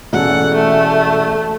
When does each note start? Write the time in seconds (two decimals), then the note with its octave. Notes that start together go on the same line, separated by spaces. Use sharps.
0.13 E1 C#4 A4 F#5
0.55 A3